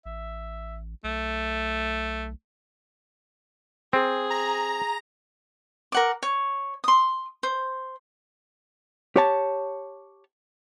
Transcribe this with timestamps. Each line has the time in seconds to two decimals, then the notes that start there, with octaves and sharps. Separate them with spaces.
0.06 A1 E5
1.04 B1 A3
3.93 C4 G#4
4.30 A#5
5.92 A#4 F#5 D6
6.23 C#5
6.84 C6 D#6
7.43 C5
9.16 G4 C#5 A5